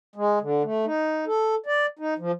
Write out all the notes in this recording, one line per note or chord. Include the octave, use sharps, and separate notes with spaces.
G#3
D3
A3
D#4
A4
D5
D#4
F3